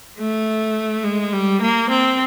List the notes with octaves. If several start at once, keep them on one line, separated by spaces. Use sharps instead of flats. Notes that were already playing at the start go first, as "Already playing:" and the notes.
A3
G#3
G3
A#3
C4